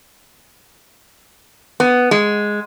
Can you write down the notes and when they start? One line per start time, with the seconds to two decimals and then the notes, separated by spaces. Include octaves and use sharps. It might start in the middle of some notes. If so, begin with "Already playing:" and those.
1.80 B3
2.11 G#3